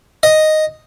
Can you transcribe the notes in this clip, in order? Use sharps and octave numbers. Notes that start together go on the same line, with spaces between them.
D#5